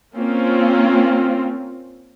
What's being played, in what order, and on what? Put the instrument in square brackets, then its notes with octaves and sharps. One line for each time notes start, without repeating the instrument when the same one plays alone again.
[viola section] A#3 C4 C#4 F4